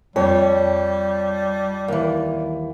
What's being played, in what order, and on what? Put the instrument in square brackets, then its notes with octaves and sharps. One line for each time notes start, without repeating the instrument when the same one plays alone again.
[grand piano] F2 [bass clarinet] G3 [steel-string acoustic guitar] C#5
[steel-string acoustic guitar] D#2 E3